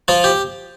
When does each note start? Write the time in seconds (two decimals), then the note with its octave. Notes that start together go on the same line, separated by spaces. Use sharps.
0.08 F3 F4
0.24 G4